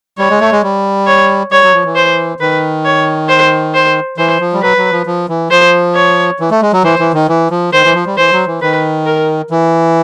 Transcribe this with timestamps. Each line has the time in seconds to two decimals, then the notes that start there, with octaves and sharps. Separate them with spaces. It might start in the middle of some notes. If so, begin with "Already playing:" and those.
0.18 G3 C#5
0.30 G#3
0.40 A3
0.52 G#3
0.63 G3
1.07 C#5
1.52 G3 C#5
1.63 F#3
1.74 F3
1.84 E3
1.95 C5
2.40 D#3 B4
2.85 C#5
3.29 C5
3.74 C5
4.18 E3 C5
4.40 F3
4.53 G3
4.62 F#3 B4
4.77 F#3
4.92 F3
5.06 F3
5.29 E3
5.51 F3 C5
5.95 C#5
6.40 E3
6.51 A3
6.62 G#3
6.73 F#3
6.84 E3 C5
6.99 E3
7.13 D#3
7.28 E3
7.51 F3
7.73 D#3 C5
7.84 E3
7.95 F3
8.06 G3
8.17 E3 C5
8.32 F#3
8.47 E3
8.62 D#3 B4
9.06 A#4
9.50 E3